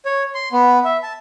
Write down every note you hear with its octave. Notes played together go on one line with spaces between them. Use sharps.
C#5
C6
B3
E5
A5